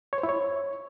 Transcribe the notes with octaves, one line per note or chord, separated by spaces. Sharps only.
C#5
C5
E4
C#5